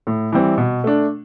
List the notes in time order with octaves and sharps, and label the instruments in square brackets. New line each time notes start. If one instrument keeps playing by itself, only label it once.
[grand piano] A2
E3 G3 C4
B2
A3 D4